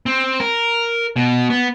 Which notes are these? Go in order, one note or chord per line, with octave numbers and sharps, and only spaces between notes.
C4
A#4
B2
B3